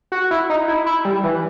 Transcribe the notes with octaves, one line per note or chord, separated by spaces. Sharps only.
F#4
E4
D#4
E4
E4
G3
E3